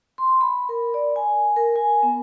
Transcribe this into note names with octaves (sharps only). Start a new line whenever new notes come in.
C6
B5
A#4
D5
G#5
A#4
G#5
B3